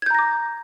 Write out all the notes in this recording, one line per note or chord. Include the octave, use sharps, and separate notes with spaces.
A#5 D6 G6 G#6 A#6